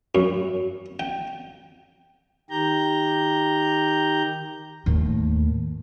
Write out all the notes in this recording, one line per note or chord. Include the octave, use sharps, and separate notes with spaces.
F#2
G5
D#3 G4 A#5 G6
D#2 A2